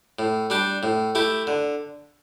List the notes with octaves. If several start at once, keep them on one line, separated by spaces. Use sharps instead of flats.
A2
G3 D4 G4
A2
A3 E4 G4
D3